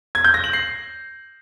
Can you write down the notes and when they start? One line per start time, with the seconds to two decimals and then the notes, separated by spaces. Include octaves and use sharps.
0.15 G#6
0.24 G6
0.34 A#6
0.44 F#7
0.53 C7